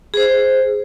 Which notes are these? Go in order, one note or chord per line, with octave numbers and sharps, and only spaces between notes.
G#4 C5